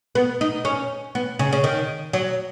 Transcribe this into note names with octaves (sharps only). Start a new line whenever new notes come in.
B3
D#4
C#4
B3
C#3
C#3
D#3
F#3